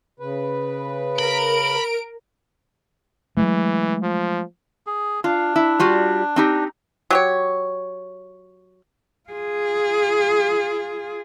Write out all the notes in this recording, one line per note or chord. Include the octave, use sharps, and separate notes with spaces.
C#3 B4
A#4 B5 D7
E3 F#3 G#3 A3
F3
G#4
D4 F4
E4
G3 F4 F#4
C4 D#4 G4
F#3 G4 C#5
F4 G#4